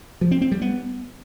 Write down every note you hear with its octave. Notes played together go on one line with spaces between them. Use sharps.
F3
C4
C4
G3
B3